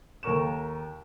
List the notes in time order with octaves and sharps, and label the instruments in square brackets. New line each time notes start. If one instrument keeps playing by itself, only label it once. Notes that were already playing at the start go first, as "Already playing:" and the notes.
[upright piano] D#2 A4 A#4 C#6 E7